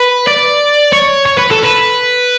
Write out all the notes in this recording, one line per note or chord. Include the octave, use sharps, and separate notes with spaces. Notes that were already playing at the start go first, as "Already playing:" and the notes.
Already playing: B4
D5
C#5
C#5
B4
A4
B4